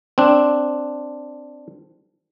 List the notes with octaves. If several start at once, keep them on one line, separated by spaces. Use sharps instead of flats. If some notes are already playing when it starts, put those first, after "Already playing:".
C4 D4